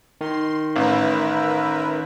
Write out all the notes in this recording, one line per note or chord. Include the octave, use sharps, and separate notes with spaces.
D#3 C6
A1 A#4 B4 E5